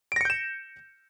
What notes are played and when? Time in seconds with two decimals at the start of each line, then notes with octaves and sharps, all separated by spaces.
0.12 D7
0.16 A#6
0.21 C#7
0.25 G6
0.30 E7